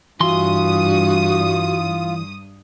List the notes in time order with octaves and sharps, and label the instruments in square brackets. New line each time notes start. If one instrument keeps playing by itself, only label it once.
[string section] G2 D#6 [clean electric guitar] E3 C6 [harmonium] F4 [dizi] F#4